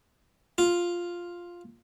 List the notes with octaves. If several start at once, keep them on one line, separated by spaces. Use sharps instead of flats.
F4